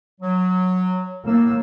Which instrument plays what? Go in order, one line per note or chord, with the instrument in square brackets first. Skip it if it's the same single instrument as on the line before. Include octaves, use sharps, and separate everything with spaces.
[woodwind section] F#3
[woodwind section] A2 E6 [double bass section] A#3